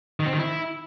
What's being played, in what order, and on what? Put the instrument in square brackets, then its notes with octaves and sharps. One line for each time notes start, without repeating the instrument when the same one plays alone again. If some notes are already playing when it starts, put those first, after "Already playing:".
[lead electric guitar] D#3
C4
D#3
E4